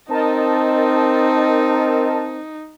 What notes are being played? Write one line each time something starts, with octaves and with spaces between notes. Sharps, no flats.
C4 D#4 A#4 D#5 A5